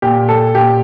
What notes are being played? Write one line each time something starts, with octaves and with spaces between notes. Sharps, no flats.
A#2 G4
A4
A#2 G4